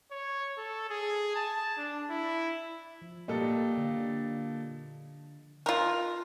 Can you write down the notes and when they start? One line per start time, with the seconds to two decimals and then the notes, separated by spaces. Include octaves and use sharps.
0.11 C#5
0.58 A4
0.90 G#4
1.36 A5
1.77 D4
2.10 E4
3.02 F3
3.28 A#2 G3 A4 D5 D#5
3.77 D3 F5
5.66 F4 A#4